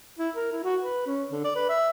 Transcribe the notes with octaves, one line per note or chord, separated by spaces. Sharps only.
E4
A#4
E4
F#4
B4
C#4
D3
D5
B4
E5